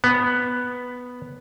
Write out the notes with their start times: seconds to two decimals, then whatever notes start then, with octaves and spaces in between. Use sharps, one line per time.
0.04 B3